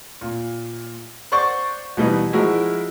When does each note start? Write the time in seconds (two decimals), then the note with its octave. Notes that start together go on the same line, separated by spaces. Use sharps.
0.21 A#2
1.32 C5 D5 F#5 C#6 D6 A6
1.97 B2 E3 G3 B3 D#4
2.32 F3 G#3 E4 F#4 A#4